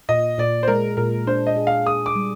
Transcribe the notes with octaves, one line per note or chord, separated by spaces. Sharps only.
A#2 D#5
A#2 D5
C5
G#3 A#4
A#2 A#4
D4 C5
D#5
G#4
F5
G#4 D#6
D6
G3